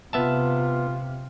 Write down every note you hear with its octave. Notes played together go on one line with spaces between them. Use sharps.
C3 B3 F4 E5 A5